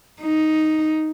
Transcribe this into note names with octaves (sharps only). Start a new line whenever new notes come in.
D#4